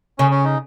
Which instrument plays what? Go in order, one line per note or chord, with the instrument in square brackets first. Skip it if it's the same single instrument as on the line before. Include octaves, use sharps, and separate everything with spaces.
[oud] C#3 [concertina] C#4
[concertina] C#4
D#4